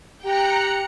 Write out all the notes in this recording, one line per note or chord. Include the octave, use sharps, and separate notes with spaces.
G4 G5 A#5 F#6 C#7